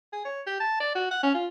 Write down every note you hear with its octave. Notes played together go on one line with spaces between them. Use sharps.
G#4
C#5
G4
A5
D5
F#4
F#5
C#4
F4